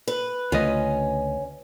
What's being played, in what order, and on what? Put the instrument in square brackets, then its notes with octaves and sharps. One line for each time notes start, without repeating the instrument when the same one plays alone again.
[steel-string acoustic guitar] B4
[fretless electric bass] C#2 D3 A3 [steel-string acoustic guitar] C#4 [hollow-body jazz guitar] F4 B4 D#5